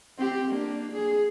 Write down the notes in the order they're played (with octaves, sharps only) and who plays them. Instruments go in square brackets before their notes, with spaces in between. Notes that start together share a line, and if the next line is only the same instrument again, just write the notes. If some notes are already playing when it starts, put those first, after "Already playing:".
[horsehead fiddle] C4 G4
A#3 D4
G#4